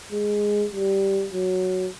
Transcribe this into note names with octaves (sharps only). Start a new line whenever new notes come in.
G#3
G3
F#3